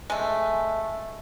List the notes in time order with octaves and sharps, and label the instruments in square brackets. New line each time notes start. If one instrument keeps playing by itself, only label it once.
[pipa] G#3 A3